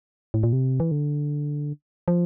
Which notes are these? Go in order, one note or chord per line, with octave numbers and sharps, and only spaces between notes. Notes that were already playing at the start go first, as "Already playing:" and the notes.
A2
A#2
C3
E3
D3
F3